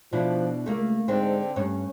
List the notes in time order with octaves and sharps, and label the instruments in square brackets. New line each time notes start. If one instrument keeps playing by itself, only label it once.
[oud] B2 D4 E4 [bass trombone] F3
[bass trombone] C#2 [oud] A3 A#3
[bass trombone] G#2 [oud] D3 C4 D4
[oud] G2 C#5 [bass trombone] C#4